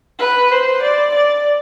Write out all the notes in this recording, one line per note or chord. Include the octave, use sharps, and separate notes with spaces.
B4
C5
D5
D5